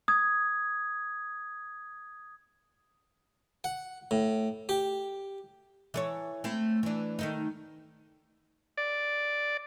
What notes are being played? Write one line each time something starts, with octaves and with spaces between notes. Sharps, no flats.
D#6 G#6
F#5
A2
G4
E3 A4 C#5
A3 C4 E4
E3 D4
D#3 A3 D#4
D5